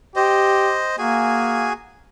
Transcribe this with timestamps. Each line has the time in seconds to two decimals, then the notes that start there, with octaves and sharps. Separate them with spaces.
0.16 G4 C5 D#5
0.98 A#3 F#4 G#4 G#5